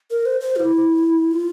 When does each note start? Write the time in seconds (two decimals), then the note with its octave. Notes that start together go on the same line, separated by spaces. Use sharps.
0.10 A#4
0.26 C5
0.41 C5
0.56 F4
0.59 E4
1.31 F4